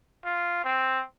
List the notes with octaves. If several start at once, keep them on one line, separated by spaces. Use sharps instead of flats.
F4
C4